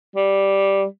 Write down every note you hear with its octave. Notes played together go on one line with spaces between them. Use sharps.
G3